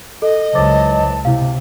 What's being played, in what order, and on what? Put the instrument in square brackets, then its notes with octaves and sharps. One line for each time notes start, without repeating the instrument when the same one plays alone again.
[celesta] A4 [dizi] D#5
[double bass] C#2 [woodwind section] E3 F#3 A5 [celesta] C5 D6 A6
[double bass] C3 [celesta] E4 F5